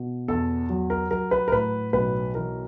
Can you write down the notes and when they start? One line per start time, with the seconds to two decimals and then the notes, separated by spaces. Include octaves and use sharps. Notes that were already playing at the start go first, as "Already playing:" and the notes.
Already playing: B2
0.28 E2 A4
0.70 F#3
0.90 A#4
1.11 F#3 A#4
1.31 B4
1.48 A#4
1.52 A2 B4
1.93 B1 B4
2.34 E3 A#4